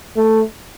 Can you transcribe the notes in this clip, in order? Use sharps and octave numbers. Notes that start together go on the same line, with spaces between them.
A3